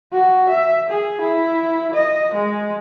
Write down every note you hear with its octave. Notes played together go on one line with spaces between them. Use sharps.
F#4
E5
G#4
E4
D#5
G#3